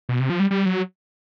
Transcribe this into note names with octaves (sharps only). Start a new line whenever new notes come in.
B2
C3
F3
G3
G3
F#3